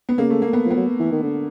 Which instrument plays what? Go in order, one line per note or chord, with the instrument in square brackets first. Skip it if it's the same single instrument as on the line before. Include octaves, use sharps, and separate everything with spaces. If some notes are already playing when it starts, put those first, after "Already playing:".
[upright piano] B3
[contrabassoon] C#3 [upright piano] A#3
[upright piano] A3
A#3
B3
[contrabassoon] F3
[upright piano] B3
[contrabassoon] F#3
E3
D#3
D3